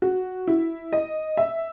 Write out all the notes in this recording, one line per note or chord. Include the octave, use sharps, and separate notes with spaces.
F#4
E4
D#5
E5